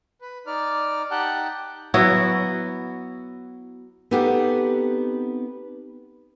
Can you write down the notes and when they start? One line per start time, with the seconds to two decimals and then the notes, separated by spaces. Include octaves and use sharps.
0.21 B4
0.47 D#4 D5 F6
1.11 D#4 G4 F#5 G5 A5 F#6
1.94 F#3 B3 E4 F#4
4.11 B3 C4 D#4 G4 A4 F#5